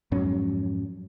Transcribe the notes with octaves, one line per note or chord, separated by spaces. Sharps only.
F2 G#2 F#3 C#4